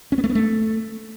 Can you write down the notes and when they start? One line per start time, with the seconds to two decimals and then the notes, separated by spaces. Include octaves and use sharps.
0.12 C#4
0.18 B3
0.24 A3
0.29 B3
0.35 A3